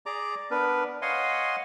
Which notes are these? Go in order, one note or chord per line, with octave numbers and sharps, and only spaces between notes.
G#4 D5 A#5 D6
B3 D4 A#4 B4
C#5 D#5 F5 F#5 G#5 C6